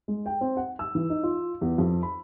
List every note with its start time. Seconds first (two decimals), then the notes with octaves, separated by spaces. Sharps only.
0.08 G#3
0.26 G5
0.41 C4
0.57 F#5
0.79 E6
0.95 E3
1.10 D#4
1.23 F4
1.61 E2
1.78 F2
2.03 B5